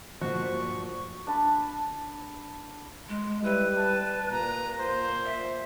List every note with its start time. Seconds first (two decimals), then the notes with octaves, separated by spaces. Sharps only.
0.21 G2 A#2 F3 F#4 C#6
1.27 D4 A5 B5
3.09 G#3
3.44 G3 E4 B4
3.77 A5
4.31 A#2 A#5
4.79 C5
5.25 E5